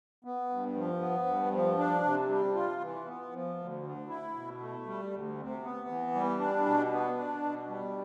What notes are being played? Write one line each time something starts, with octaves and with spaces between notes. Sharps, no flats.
B3
G2
F3
B3
G2
F3
D4
C3
G3
F4
E3
B3
F3
D2
D3
E4
B2
A3
G3
D2
C3
B3
E3
G3
D4
B2
B3
D4
B2
G3